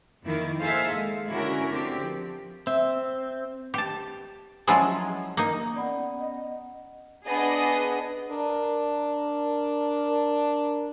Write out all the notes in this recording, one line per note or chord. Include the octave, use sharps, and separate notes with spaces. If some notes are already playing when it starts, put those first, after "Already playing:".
F2 D#3 A#3 E4
D#4 G#4 A4 C5 E5 F5
G#3
D3 C#4 E4 F#4 A#4
D3 C4 G4
F3
C4 E5
G4 A5
F3 F#3 G#3 C#4 E4 F4
A#3 D#4
B3 C#4 D5 F#5 A#5 B5
D#5
B3 D4 G#4 D#5
D4 A#4